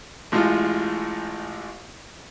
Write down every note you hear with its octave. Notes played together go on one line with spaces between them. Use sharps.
A1 A2 G#3 F4 F6